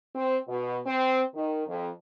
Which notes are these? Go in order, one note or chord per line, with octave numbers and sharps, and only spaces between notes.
C4
B2
C4
D#3
F2